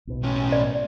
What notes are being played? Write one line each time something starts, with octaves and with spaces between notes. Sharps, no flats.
B1 B2
A2 C#4
D5